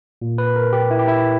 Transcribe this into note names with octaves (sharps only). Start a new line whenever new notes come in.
A#2
B4
A#4
G4
E4
G4
E4